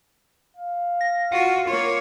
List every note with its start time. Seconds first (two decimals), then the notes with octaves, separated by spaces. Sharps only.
0.57 F5
1.01 A#6
1.32 F4 F#4 F#5
1.67 A#3 F4 C#5